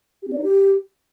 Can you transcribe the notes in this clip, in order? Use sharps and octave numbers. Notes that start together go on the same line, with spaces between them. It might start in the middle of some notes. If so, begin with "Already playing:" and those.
G4
C4
D5
D#4
G4